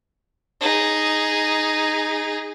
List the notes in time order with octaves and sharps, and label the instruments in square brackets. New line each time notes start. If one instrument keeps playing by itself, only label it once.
[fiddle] D#4 G#4